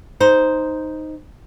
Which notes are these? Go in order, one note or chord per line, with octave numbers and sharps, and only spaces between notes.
D#4 C5